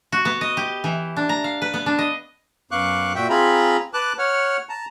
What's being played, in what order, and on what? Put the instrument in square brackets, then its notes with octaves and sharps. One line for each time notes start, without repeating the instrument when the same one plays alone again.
[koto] F#4
B3
D#5
G4
E3
D4
A#5
F5
B4
B3
D4
D#5
[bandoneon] F#2 B3 F5 C#6 D6 F#6
A#2 F#4 E5 G5
C4 F4 G#4 A#5 B5
B4 A5 D6 F#6
C#5 F#5 F6
A5 A#5